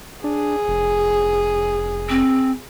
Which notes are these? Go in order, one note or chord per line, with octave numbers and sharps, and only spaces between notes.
D4 G#4
F1
C4